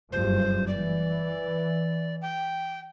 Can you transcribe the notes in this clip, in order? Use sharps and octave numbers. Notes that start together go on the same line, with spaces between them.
F#1 G2 F3 C5
E3 D5
G5